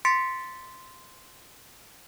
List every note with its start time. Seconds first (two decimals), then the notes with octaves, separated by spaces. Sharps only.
0.05 C6 A6 B6 C#7 D7